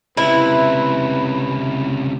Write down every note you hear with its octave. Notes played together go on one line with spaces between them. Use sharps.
C#2 C3 E4 B4